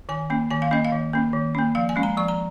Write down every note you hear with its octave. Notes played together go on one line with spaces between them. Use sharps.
D#3 G#5
A#3 C#4
D#3 G#5
F5
A#3 C#4 D#5
F5
D#3
A#3 C#4
D#3
A#3 C#4
F3 F5
G#5
G#3 C#4
A#5
F3 C#6
A#5